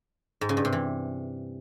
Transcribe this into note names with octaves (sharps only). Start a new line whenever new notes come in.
G#2
C#3
G2
C3
E3